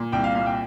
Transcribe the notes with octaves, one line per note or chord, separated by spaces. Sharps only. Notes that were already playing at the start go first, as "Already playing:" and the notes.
Already playing: A#2
C2 G5
F5
A#2 F5
G5